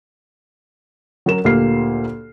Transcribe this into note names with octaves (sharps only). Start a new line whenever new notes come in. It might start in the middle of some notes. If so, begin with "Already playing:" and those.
F#3 C#4 A#4 E7
D2 A#2 A#3 G4 F6 C7